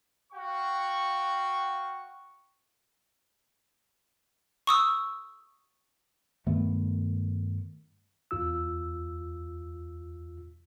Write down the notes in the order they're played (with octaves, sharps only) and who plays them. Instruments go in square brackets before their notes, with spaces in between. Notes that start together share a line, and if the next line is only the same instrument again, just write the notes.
[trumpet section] F#4 F5 G5 C#6
[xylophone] C#6 D#6 E6
[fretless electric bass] G2 D#3 A3 B3
[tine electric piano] E2 F4 E6